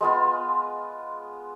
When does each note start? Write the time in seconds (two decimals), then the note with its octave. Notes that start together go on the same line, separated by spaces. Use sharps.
0.01 G#3 B3 F4